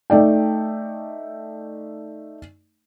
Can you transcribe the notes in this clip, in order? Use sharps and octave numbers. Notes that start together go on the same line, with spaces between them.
A3 D#4 D5 G5